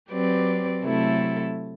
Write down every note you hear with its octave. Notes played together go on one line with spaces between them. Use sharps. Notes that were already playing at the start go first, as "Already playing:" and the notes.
F#3 C4 G4 B4 D5
C3 F#3 A3 E4 A4